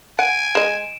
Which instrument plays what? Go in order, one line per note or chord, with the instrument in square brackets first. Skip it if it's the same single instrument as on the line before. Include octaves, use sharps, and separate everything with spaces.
[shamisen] F#5 [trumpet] G#5 [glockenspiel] D7 D#7
[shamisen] G#3 D#5 [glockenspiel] E7